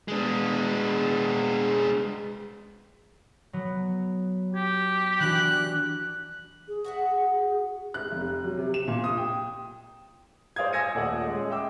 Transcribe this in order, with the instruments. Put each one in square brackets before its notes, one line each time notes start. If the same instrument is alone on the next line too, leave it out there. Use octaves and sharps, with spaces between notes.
[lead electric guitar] G#3 D4
[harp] F#3 B3
[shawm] G4 [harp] G#6
[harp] E3 D4 F#4 [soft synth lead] F#6
[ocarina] G#4
[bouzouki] F#4 E5 F#5
[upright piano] F#6
F1
F#3
C3
E7
A#2
D#6
G5
[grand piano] C5 D5 F5 D#6 G#6
G#5 E6 G#6 A#6 C#7 D#7
D#1 A3 D5 F#5 D#6
G#3 C#4 G#4
E5 G5 D6 E6